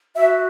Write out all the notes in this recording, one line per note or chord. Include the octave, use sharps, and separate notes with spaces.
F#4 E5